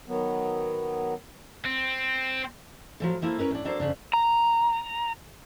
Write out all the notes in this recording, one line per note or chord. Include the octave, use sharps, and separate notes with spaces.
D#3 F#3 B3
C4
A2 F3 F#3
F3 A#3 E4 A4
C#4 A#4 B4 C#5
A2 D4
F#3 A#3 D4 A4 C5
F2 C#3 D4
A#5